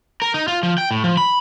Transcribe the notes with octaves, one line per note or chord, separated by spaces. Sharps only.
A#4
D#4
F4
F3
G5
A2
F3
B5